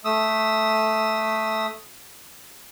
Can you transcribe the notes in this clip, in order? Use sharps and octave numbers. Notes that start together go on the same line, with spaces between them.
A3 D#6 E6